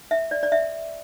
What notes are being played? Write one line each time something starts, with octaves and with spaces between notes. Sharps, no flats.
E5
D5
D5
E5